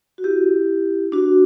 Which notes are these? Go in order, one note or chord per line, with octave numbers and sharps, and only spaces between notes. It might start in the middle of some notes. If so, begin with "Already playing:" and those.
F#4
E4 G4
D4 F#4